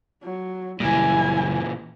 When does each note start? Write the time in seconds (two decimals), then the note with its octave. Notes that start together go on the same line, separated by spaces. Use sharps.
0.23 F#3
0.80 F#1 A#2 E3 G3 E4 G#5